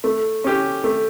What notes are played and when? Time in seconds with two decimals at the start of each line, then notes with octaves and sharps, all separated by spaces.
0.04 A3
0.44 C#4 G4
0.84 A3